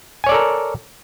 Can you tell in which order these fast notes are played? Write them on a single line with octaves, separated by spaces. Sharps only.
G#5 C#5 D5 A4 A#4